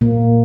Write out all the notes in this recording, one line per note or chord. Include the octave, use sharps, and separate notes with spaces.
A#2 A#3